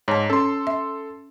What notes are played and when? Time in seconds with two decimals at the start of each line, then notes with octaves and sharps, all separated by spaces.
0.08 G#2 C#5 A5
0.30 C#4 A4 C6
0.67 E5